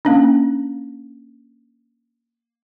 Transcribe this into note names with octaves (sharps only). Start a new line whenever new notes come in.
A#3 C#4 D4